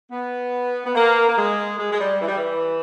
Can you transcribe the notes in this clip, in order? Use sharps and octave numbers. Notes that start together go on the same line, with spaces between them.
B3
B3
A#3
A#3
G#3
G#3
G#3
G3
E3
G3
E3